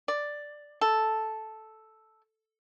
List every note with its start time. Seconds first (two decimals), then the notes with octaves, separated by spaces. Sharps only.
0.08 D5
0.81 A4